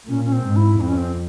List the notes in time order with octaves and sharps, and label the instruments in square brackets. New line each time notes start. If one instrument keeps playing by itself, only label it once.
[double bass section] A#2 [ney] C#4
[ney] C#4
C4
[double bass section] G#2
[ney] E4
[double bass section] F2 [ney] C4
[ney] C#4
C4